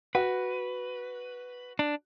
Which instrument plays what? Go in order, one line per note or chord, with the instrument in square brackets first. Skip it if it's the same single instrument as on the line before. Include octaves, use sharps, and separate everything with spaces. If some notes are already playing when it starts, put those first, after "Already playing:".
[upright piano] F#4 [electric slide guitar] B4
[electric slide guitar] D4